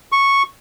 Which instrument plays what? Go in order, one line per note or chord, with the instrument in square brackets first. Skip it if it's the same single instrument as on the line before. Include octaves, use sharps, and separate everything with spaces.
[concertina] C#6